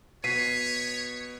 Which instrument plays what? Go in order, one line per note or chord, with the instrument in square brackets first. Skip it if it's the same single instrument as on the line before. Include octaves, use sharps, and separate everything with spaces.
[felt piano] B2 [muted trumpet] C#5 [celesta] B6 C7 D#7